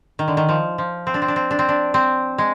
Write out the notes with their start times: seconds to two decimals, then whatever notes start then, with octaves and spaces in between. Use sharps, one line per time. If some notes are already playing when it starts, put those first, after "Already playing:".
0.19 D#3
0.28 D3
0.37 D#3
0.49 F3
0.78 F3
1.07 C4
1.14 D4
1.22 C4
1.28 D4
1.36 C4
1.51 D4
1.59 C4
1.69 D4
1.94 C4
2.38 G#3